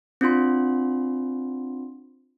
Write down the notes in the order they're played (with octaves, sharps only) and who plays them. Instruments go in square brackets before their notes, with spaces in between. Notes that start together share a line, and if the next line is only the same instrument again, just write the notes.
[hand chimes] C4 D4 F4 C6